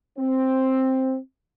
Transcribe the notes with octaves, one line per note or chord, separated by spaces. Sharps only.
C4